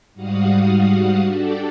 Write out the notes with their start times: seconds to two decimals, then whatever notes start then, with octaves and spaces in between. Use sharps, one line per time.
0.14 G#2 G3 F#4 F5 F#5 D#6
1.23 D4 F#4 G4 A4 D5